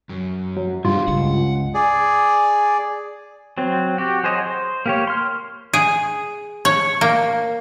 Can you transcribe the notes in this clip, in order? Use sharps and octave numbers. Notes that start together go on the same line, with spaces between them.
F#2
F#3
G2 E4 F4 G#4
C#2 F#5
G#4 D5
F#3 C4
F#4 G4
F#3 G#4 C5 C#5 D#5
C5
A#3 G4 C#5
C6 F6
G#4
C#5
A#3